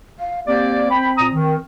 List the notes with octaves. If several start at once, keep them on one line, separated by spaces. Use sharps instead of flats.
F5
A#3 C4 G4 D5
G5 B5
A#2 A#5 D#6
D#3